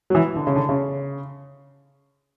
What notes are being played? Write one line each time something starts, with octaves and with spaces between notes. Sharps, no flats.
F#3
E3
D3
C#3
D3
C#3